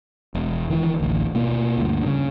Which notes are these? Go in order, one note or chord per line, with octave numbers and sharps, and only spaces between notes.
E1
D#3 E3
A1 D2
B2 A#3
D2 G2
C#3